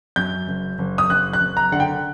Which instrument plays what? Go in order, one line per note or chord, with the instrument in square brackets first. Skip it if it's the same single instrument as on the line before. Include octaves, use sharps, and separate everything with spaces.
[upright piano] F#2 G6
F#1
F#1
D#6
F#1 F#6
F#6
F#1
A#5
D3 F#5
G5